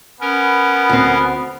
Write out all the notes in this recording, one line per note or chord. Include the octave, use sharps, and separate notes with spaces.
B3 C#4 A#4
D2 C4